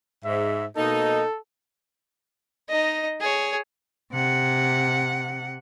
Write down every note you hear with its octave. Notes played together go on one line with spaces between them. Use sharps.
G#2 E5
B2 A#3 D#4 A4
D#4 D#5
G#4 C#5
C3 F#5